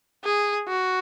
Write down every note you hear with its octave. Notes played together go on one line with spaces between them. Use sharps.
G#4
F#4